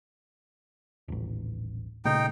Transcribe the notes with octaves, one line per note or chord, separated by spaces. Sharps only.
D#1 A1
A#2 C#3 A3 D#4 G5